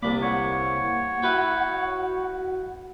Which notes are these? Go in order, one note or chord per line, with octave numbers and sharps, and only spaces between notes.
C2 A#3 D5 B5 D6
C#5 F#5
E4 F#4 B4 G5